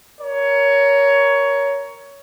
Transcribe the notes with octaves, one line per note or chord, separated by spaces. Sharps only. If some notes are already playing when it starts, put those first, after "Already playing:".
A#4 C#5